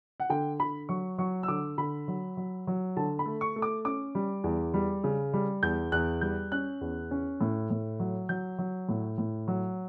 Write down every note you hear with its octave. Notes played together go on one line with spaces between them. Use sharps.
F#5
D3 G5
D3 B5
F#3 C#6
F#3 C#6
E6
D3 D6
D3 B5
F#3
F#3
F#3
D3 A5
B5
A3
C#6
A3
D6
C#4 D6
G3
E2
G3
C#3
G3
E2 G6
E2 F#6
G3 G6
C#4 F#6
E2
C#4
A2
A2
F#3
F#3 G6
F#3
A2
A2
F#3